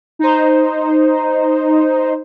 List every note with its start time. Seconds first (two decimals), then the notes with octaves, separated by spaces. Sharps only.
0.19 D#4 C5